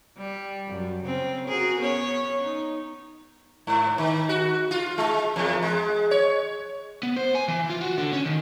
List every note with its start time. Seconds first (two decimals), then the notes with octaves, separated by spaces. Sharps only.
0.17 G3
0.68 F#2
1.03 C#3 C4 C#4
1.47 F#4 G#4 A#4
1.79 B3 C#4 C#5
2.42 D#4
3.67 G#2
3.98 D#3
4.29 F#4
4.71 F4
4.98 G#3
5.36 E2
5.62 G#3
6.11 C#5
7.03 B3
7.17 C5
7.35 G#5
7.48 E3
7.70 F4
7.81 F#4
7.98 D3
8.13 C#4
8.25 D#3